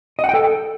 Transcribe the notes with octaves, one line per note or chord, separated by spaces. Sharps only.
D#5
F#5
G5
A4